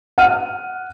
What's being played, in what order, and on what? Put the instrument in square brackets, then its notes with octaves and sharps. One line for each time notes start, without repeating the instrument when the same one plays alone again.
[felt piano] F#5 F6 D#7